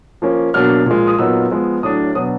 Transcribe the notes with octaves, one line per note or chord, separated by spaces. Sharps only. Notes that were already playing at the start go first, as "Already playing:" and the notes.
F3 A#3 C#4
B2 F#3 A#3 D4 F6
A#2 F3 G#3
D#6
A#2 F#3 B3 D#4 E6
F3 G#3 B3
A2 F#3 A3 D4 D#6
B2 F#3 B3 D4 D#6